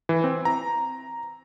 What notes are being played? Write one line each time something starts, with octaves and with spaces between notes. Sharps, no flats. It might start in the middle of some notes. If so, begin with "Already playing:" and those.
E3
C4
A#5